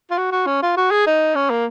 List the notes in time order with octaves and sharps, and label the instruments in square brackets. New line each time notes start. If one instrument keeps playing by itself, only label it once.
[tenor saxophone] F4
F#4
F#4
C#4
F4
F#4
G#4
D#4
C#4
A#3